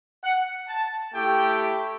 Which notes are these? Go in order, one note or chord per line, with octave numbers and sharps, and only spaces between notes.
F#5
A5
A3 E4 G4 G5